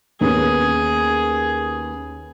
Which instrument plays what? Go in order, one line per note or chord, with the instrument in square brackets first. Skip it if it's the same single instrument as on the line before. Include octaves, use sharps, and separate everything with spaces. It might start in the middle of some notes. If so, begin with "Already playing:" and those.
[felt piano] D#2 B3 C#4 [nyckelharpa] G#4